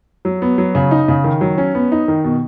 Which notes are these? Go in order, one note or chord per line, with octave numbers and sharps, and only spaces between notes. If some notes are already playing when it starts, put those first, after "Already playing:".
F#3
B3
F#3
C#3
D#4
C#3
D#3
F#3
C#4
B3
D#4
D#3
B2